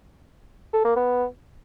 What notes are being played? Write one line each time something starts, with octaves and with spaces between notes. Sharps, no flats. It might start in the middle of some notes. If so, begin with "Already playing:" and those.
A4
A#3
B3